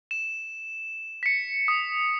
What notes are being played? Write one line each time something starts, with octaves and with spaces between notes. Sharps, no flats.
E7
B6 C#7
D#6